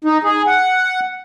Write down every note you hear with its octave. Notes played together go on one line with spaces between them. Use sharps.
D#4
G#4
F#5